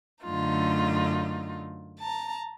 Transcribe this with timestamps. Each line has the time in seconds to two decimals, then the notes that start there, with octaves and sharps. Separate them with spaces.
0.24 F#2 D3 A3 D#4 F4
1.98 A5 A#5